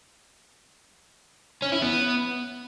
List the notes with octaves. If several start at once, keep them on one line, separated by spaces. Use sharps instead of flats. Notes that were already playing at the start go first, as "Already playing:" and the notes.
C#4
E4
B3